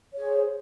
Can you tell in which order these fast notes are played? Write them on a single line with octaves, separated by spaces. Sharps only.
C#5 G#4 C5